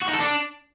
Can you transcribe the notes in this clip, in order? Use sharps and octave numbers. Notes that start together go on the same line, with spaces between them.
F#4
D#4
A4
D4